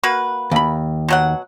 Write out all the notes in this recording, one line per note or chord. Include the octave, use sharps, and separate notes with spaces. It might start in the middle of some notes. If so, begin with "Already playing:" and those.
A#3 F#4 B4
D#2 B5
B2 F#3 F#5